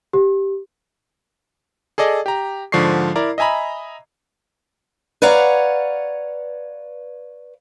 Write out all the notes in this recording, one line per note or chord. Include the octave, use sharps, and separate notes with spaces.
G4
G#4 A4 D5 D#5
G4 A#5
G#2 D3 F3 D5 C#6 C7
E4 A#4 D5 A#5
D#5 E5 G#5 A#5 B5
B4 C#5 D5 F5 F#5 A#5